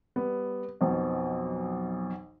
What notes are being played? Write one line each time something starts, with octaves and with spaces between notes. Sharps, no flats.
G3 B3
B1 F2 B2